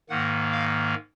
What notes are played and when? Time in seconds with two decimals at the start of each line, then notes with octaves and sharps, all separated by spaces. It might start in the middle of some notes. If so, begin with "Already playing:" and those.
0.09 G#2 D#3 A#3 F#5
0.52 F5